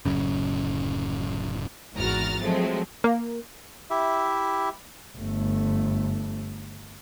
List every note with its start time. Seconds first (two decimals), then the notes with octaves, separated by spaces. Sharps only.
0.05 D1 F#2 C#3
1.95 G#1 E2 F#4 A#5 F6 A6
2.42 F3 F#3 G#3 A3 C4
3.04 A#3
3.90 E4 G4 E5
5.18 G1 A3